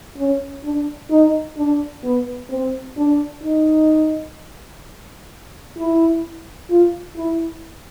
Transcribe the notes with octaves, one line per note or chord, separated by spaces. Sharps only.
C#4
D4
D#4
D4
B3
C4
D4
D#4
E4
F4
E4